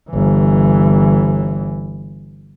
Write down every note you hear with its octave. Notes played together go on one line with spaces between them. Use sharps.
G1 E3